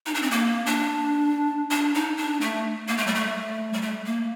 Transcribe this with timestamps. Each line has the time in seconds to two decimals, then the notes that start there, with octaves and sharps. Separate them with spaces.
0.06 D#4
0.14 D4
0.22 C4
0.31 A#3
0.66 D4
1.71 D4
1.94 D#4
2.17 D4
2.41 A3
2.88 A#3
2.97 A3
3.07 G3
3.15 A3
3.73 G3
3.81 A3
4.05 A#3